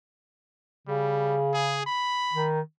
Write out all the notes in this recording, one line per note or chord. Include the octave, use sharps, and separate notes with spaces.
C#3 G3
G#4
B5
D#3